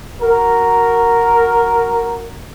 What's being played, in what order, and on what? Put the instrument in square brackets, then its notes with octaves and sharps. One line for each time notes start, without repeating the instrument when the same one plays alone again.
[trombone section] F#4 A#4